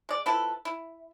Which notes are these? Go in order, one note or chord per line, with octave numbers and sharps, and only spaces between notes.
G#3 D5
F3 E4 A4 B4
E4